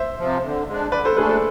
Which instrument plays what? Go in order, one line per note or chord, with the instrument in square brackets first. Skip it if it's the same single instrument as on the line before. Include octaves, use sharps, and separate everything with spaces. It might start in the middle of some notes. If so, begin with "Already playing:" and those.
Already playing: [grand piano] C5 E5
[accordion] C3 F3
D3
G#3 D4
[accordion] D3 [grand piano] B4 D5
[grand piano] A4 C5
[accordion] A3 D4 [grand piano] G#4 B4
[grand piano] A4